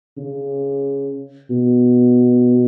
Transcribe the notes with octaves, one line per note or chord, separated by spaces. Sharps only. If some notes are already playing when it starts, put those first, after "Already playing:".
C#3
B2